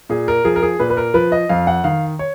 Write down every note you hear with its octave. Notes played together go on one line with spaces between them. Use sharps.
A#2 G#4
A#4
F3 G#4
A#4
G#4
A#2 B4
B4
A#4
F3 B4
D#5
F2 F5
F#5
D#3 F5
C#5